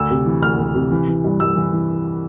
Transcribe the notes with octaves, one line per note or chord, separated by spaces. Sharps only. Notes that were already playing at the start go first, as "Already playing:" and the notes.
Already playing: D2 E6
C3
E3
D2 F6
D2
C3
E3
E3
G2
G2 E6
E3
E3